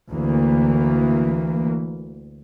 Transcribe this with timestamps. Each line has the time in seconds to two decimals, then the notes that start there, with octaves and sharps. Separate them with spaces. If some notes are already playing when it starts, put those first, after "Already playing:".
0.11 D2 E3 A#3